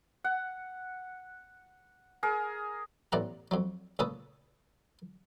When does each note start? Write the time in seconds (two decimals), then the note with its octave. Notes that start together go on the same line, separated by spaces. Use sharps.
0.24 F#5
2.23 G#4 A#4
3.12 A1 A2 B3 D5 F#5 A#5
3.51 F2 F#3
3.99 C#2 A#2 A4 B4 A5 D#6